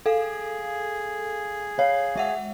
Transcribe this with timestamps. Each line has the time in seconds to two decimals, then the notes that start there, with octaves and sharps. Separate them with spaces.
0.06 G#4 A4 F5
1.79 C#5 F5
2.16 G#3 E5 F#5